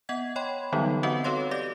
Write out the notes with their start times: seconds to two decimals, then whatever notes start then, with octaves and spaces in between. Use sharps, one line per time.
0.09 B3 D#5 F#5 G#6
0.36 C#5 D#5 G5 B5 C6
0.73 D3 E3 F#3 G3 B3 D#4
1.03 B3 C4 F#4 B4 D#5 F#5
1.24 F#4 A4 B4 C#5 F5 C6
1.51 G4 D5 D6 A#6